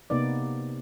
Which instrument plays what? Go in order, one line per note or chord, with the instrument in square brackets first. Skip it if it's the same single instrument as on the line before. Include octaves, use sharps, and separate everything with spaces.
[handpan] C3 A#3 B3 D#4 D5